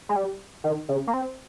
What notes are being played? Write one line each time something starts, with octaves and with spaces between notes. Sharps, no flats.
G#3
G3
D#3
C#3
A#3
C4